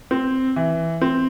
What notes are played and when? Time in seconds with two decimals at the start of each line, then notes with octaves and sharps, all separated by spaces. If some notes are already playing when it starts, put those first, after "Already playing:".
0.11 C4
0.56 E3
1.01 C4